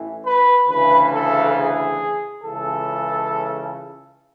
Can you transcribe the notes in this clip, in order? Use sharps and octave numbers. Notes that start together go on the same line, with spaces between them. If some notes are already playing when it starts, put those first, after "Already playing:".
Already playing: A1 A2 E3
B4
D2 C#3 E3 B4
A4
G#4
C#2 C#3 E3 A4